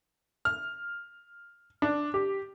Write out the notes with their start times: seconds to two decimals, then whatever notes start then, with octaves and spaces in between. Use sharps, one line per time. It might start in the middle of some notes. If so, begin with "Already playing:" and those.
0.45 F6
1.82 D4
2.14 G4